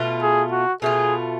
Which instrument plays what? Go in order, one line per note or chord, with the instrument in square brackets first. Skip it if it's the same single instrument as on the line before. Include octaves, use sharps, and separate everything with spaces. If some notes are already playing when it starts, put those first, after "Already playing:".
Already playing: [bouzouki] B2 A3 F4
[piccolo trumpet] G#4
F#4
[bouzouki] B2 A3 F4 [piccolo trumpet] G#4